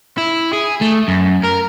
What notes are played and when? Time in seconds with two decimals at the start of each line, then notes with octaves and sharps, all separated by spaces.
0.18 E4
0.53 G#4
0.81 A3
1.08 F#2
1.44 A#4